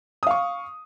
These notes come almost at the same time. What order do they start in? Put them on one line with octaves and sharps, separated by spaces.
D#6 F5 C#6